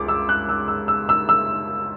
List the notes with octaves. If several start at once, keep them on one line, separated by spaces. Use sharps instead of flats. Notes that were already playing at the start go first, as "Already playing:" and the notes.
Already playing: C#2 D6
E6
F#6
E6
E6
E6
E6
E6